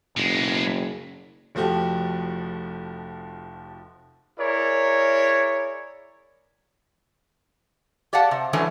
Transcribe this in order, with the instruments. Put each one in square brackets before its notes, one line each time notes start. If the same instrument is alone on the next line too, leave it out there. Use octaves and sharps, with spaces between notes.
[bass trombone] F#1 [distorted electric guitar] B2 G#3
[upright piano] F1 F3 A3 F#4 G4
[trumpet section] E4 G#4 A#4 C#5 D5
[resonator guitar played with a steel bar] G4 D5 F5 F#5 A5
C3
E3 F#3 G#3 A3 C#4 D4